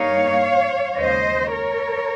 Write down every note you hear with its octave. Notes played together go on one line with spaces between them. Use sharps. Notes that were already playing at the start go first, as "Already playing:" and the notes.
Already playing: G2 G3 A#3 D#4 C#5 F5
D#2 C#3 G#3 C5 D#5
A#4 C#5